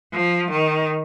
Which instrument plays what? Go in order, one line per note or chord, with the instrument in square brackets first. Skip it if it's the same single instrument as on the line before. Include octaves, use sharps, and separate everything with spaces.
[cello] F3
D#3